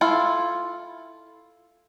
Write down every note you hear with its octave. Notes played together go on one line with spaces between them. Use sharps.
E4 F4 A4